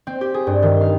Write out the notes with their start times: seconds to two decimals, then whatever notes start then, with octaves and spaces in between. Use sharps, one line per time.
0.07 C4
0.21 G4
0.34 G#4
0.47 G2
0.62 D#3
0.81 F5